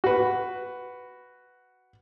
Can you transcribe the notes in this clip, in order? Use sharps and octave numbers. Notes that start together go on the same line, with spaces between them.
F#4 B4